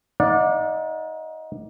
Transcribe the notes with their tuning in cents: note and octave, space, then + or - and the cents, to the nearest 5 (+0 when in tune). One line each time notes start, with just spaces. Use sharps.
D#4 +25 D5 +0 F#5 -40